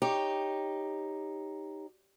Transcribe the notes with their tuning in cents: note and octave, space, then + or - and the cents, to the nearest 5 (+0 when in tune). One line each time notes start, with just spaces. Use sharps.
D#4 +0 G4 +10 C#5 +0